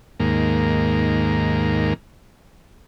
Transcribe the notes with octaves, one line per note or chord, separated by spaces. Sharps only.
D#2 G#2 A#3